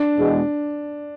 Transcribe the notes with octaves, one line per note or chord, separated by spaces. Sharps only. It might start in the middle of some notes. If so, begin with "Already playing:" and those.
Already playing: D4
E2 B2 G#3